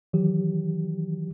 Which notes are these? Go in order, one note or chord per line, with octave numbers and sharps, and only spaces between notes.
D#3 E3 F#3 G4